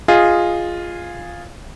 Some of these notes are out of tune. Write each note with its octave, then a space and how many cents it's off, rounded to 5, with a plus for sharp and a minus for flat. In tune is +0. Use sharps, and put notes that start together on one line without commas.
F4 +0 G#4 -10 D#5 +0